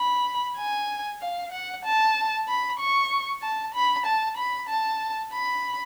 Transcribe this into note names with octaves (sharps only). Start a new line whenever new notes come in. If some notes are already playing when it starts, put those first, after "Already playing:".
Already playing: B5
G#5
F5
F#5
A5
B5
C#6
A5
B5
A5
B5
A5
B5